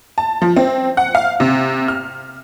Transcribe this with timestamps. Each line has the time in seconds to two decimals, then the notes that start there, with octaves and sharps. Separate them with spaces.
0.18 A5
0.42 F3
0.57 C4
0.97 F#5
1.15 F5
1.40 C3
1.88 F6